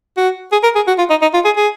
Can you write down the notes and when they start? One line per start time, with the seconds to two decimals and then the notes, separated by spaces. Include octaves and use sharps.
0.17 F#4
0.52 G#4
0.63 A#4
0.75 G#4
0.87 F#4
0.98 F4
1.10 D#4
1.22 D#4
1.34 F4
1.45 G#4
1.56 G#4